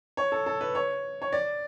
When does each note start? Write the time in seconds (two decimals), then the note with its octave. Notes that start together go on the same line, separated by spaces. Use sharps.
0.17 C#5
0.32 A4
0.46 A4
0.61 B4
0.75 C#5
1.22 C#5
1.32 D5